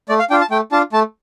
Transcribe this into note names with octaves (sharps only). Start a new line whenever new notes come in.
A3 D5
F5
D4 F4 G5
A5
A3 G5
D4 F4 A5
A3 A5